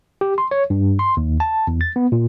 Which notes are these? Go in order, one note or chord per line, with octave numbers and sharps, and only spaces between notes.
G4
C6
C#5
G2
C6
D#2
A5
E2
A6
B3
A#2